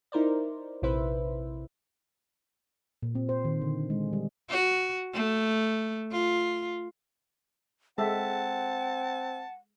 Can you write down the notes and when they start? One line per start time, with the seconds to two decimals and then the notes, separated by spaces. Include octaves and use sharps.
0.12 D#4 E4 A#4 C5 D5
0.82 A#1 C3 E4 B4 C5 E5
3.03 A#2
3.15 C4
3.29 C5
3.45 D#3
3.62 D3
3.90 G#3
4.13 G3
4.50 F#4
5.14 A3
6.11 F4
7.98 G#3 C4 A4 E5 F#5 A5